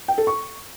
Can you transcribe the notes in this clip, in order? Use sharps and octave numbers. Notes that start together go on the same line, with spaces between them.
G5
A4
C#6